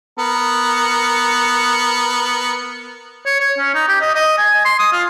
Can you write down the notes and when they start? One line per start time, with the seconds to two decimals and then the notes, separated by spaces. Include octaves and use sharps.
0.19 B3 A#4
3.26 C#5
3.41 C#5
3.58 C#4
3.75 D#4
3.88 G4
4.01 D#5
4.15 D#5
4.38 G#5
4.65 C6
4.79 D#6
4.93 F4